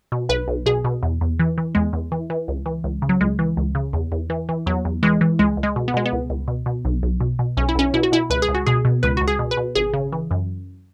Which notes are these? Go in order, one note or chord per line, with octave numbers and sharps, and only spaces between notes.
B2
B1 B4
B1
B2 G#4
B2
E2
E2
E3
E3
E2 G#3
E2
E3
E3
C#2
E3
C#2
C#3
F#3
C#2 G#3
E3
C#2
C#3
E2
E2
E3
E3
E2 F#3
E2
E3 G#3
E3
C#2 G#3
C#2
G#3
B2
B3
B2 G#3
B3
C#2
C#2
B2
B2
B1
B1
B2
B2
B1 C#4
E4
B1 C#4
B2 E4
F#4
B2 E4
C#2 B4
G#4
C#2
F#4
B2 G#4
B2
C#2 B4
C#2 F#4
G#4
B2
B4
B2
G#1 G#4
C#3
E3
F#2